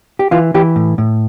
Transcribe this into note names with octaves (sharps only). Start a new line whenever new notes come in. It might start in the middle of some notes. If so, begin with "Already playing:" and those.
G4
E3 F4
E3 G4
A2
A2